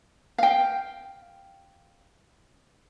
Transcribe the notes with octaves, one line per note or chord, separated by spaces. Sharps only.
F5 G5